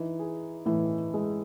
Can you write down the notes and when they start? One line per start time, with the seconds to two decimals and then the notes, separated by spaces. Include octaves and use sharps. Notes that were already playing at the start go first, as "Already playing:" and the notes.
Already playing: E3 D#4
0.19 G#4
0.65 A2 E3
1.13 G#3